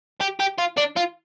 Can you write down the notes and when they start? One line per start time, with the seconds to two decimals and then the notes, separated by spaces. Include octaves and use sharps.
0.21 G4
0.40 G4
0.58 F4
0.78 D4
0.97 F4